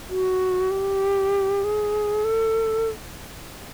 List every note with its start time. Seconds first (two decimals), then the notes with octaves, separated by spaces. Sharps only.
0.09 F#4
0.71 G4
1.64 G#4
2.24 A4